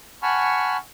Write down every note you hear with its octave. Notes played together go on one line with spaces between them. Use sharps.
F#5 G#5 A5 B5 C#6 F6